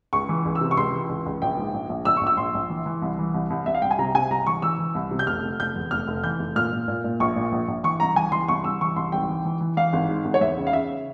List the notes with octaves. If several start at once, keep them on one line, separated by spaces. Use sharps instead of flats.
C#2 C#6
E3
C#2
E6
C3
C#6
C#2 C6
E3
C#2
C#2
A#1 G5
G#2
A#1
A#1
A#1 E6
A#1 C#6
E6
A#1 C6
A#1
E3
E3
C2
E3
C2
C2
C2 E5
F5
C2 G5
G#5
C3 A#5
C3 G#5
C2 A#5
E3 C#6
E3 E6
E3
C2
C3
G6
F1 F6
F1
F1 G6
E2
F1 F6
F1
E3 G6
F1
A#2 F6
A#2
A#2
A#2
A#1 C#6
A#2
A#1
A#1
E3 C#6
C2 A#5
E3 G#5
E3 C6
C2 C#6
C2 E6
E3 C#6
C2 C6
G#1 G5
E3
E3
E3
E3 F5
G#1
G#2
G#1
C#5
E2 E5
C#3
F5
C#3 E5